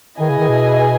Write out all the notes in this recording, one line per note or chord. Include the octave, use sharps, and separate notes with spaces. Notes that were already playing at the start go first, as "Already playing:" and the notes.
D#3 E4 G#4 B4 D#5 G#5
C#3
D#3
B2